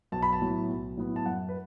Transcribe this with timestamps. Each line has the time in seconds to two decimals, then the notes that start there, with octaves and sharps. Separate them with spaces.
0.12 B1 A5
0.22 B5
0.33 A5
0.41 A2 F#3 B3 E4
0.69 B1
0.97 A2 F#3 B3 E4
1.16 A5
1.26 F#2 F#5
1.49 B4